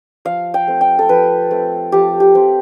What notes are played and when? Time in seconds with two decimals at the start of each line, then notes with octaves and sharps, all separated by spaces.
0.25 F3 F5
0.54 G5
0.68 A3 C4
0.81 G5
0.99 A4
1.09 F3 B4
1.51 A3 C4
1.92 F3 G4
2.20 G4
2.35 A3 C4